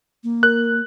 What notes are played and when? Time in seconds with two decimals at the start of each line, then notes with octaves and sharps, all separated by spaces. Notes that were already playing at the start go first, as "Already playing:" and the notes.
0.24 A#3
0.43 A#4 F#6